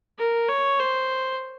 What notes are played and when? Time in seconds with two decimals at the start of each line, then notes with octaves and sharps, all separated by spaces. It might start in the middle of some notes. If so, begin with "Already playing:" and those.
0.18 A#4
0.48 C#5
0.79 C5